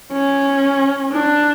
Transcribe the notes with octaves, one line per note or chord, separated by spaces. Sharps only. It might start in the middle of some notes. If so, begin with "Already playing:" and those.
C#4
D4